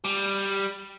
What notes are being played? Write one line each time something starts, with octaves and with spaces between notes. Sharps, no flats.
G3